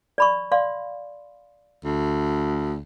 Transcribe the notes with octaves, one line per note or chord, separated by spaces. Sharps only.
D5 B5 C#6
D5 F5 C6
D2